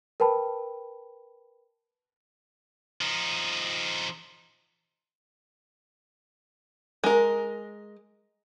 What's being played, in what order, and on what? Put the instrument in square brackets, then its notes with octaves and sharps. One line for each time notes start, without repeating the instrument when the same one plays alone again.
[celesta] A#4 B4 G5 A5 B5
[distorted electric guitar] F3 D#4
[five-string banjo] G#3 A#4